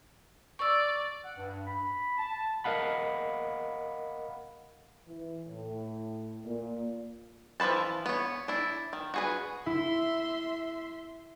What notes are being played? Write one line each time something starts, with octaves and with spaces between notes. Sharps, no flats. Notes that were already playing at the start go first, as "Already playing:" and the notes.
D5 C#6 E6
F#5
G2
B5
A5
A#4 D#5 F5 F#5 B5
E3
A2
A#2
E3 F3 F#4 B4 A5
B3 C#5
D4 E4
D#3
F#4 G#4 B4
E4 E5 C6